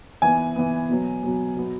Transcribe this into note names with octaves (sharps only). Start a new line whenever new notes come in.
E3 B3 G#5
E3 B3
B2 F#3 B3
B2 F#3 B3
B2 F#3 B3